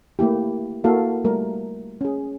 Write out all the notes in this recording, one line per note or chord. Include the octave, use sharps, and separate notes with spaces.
A3 A#3 E4 G4
A#3 E4 F#4 A4 F5
G3 A3 A#4
C#4 G#4